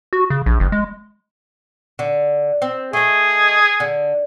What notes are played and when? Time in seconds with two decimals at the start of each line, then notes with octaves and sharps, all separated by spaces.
0.13 F#4
0.30 C#3
0.46 A#1
0.60 F#1
0.72 G#3
1.99 D3
2.62 C4
2.93 A3 G#4 D#5
3.80 D3